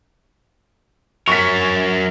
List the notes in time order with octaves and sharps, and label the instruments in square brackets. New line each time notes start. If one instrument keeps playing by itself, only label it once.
[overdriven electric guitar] F#3 A#4 [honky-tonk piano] C#6 B6